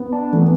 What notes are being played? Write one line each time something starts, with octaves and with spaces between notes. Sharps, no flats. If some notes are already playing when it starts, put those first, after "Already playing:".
Already playing: B3
D4
E3 A3
B3